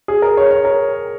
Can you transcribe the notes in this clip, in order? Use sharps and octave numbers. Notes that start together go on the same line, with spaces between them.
G#4
A#4
C#5
C#5
A#4